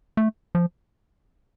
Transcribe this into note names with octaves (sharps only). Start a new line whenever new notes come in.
A3
F3